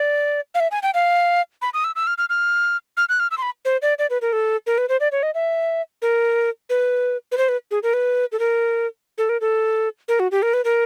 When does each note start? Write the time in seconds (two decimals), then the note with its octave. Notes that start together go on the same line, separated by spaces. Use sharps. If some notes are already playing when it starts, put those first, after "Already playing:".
Already playing: D5
0.55 F5
0.60 E5
0.71 G#5
0.83 G5
0.94 F5
1.62 B5
1.74 D#6
1.84 E6
1.96 E6
2.07 F6
2.18 F6
2.29 F6
2.97 F6
3.09 F#6
3.20 F6
3.31 E6
3.38 C6
3.42 B5
3.65 C5
3.82 D5
3.99 D5
4.10 B4
4.22 A#4
4.33 A4
4.67 A#4
4.78 B4
4.89 C5
5.00 D5
5.12 C#5
5.23 D#5
5.34 E5
6.02 A#4
6.70 B4
7.32 B4
7.38 C5
7.49 B4
7.71 G#4
7.83 A#4
7.93 B4
8.32 A4
8.39 A#4
9.18 A4
9.29 A#4
9.41 A4
10.08 A#4
10.20 F#4
10.31 G4
10.42 A#4
10.53 B4
10.65 A#4